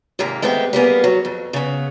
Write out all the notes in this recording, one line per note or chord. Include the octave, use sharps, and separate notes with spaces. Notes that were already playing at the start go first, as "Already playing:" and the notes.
D#2 G#2 C3 A#3
G#3 A3 B3 C4 G4
G3 A#3 B3 G#4
F#3
F2
C#3 B3